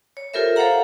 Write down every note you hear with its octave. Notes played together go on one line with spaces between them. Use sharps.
C#5
F4 G4 A4 A#4 C5 E5
A4 C5 C#5 F5 F#5 A#5